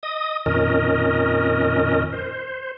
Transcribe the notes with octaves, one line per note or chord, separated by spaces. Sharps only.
D#5 D#6
F2 A#2 D#3 C#4 A#4 D#5
C5